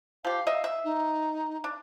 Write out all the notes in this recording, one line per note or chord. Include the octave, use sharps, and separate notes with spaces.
F3 G4 F5
D#5 E5
E5
D#4
D4